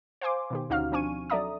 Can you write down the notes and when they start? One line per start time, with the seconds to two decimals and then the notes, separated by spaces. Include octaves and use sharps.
0.21 C5 F5 G#5 C6 D6
0.50 B2 D#3 G4
0.70 D2 C#4 D#4 F#4 F5 F6
0.92 F3 C4 D4 G#5 C#6 D#7
1.30 F#3 A4 D5 E5 A#5 D#6